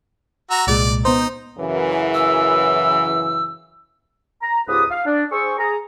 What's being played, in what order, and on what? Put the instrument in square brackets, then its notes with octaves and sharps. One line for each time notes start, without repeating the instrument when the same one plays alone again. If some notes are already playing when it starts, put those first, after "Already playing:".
[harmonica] F#4 A#5 E6
[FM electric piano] C2 A#2 G#3 [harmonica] D5
[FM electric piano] B3 C5 [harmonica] D#4
[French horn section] F#2 C#3 E3
[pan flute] E6
[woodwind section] A#5
C#2 G#2 F4 G4 B4 D#6
F5
D4
G#4 C5 C#6 E6
G#4 A#5